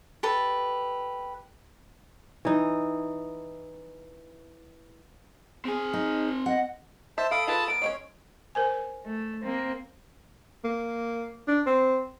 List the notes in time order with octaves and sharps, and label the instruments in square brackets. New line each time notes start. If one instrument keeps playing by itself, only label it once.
[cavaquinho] G4 A4 B4
[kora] E3 D#4
[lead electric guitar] C4 G#5 [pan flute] G#4
[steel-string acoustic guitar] D#4
[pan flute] D#5 [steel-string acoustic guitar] F#5
[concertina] C5 A5 [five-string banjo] E5
[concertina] A4 B5 D#6 [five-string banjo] F5 [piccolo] D7
[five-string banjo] F4 G#4 B4 [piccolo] A5
[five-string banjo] B3 A#4 [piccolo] D7
[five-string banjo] G#3 C4 C#4 [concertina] C#5
[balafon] A#4 C5 G#5
[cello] A3
A#3 C4
[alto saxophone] A#3
D4
C4